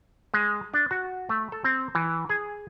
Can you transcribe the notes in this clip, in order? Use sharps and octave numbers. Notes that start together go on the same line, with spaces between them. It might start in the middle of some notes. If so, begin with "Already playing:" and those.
G#3
D4
F#4
A3
A4
C4
E3
G#4